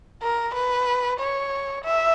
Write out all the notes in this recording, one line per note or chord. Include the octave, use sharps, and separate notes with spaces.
A#4
B4
C#5
E5